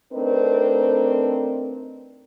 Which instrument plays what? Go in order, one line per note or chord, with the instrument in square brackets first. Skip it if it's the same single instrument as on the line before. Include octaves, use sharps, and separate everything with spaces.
[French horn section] A3 C4 D4 D#4 A#4 B4